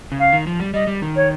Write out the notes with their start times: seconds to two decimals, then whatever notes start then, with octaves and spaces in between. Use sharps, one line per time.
0.12 C#3
0.19 F5
0.33 D#3
0.47 F3
0.60 G3
0.74 G3 D#5
0.87 G3
1.02 D#3
1.16 C#5